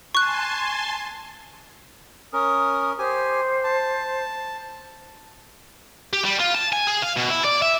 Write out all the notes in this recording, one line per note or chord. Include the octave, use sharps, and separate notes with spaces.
G#5 A5 C6 C#6 F#6
C#4 A#4 D#6
G4 C5 G#5
A5
G4
G3
F4
A5
G#5
G#4
F5
B2
E4
D5
E5